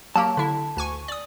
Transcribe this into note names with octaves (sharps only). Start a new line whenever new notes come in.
F#3 A#3 G4 A5
D3 E4
D2 G#5 C#6
D5 D#6